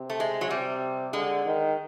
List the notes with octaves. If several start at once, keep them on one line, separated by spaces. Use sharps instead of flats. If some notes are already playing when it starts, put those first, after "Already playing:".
Already playing: C3
A3
G#3
F#3
C3 G3
D3 G#3
D#3